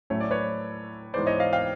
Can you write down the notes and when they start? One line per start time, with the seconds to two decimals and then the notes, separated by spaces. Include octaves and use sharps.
0.10 A2 F#3 A3 C#4 C#5
0.21 D5
0.31 B4 C#5
1.14 G#2 E3 G#3 B3 C5 D5
1.27 C#5 D#5
1.40 D#5 F5
1.53 F5 G5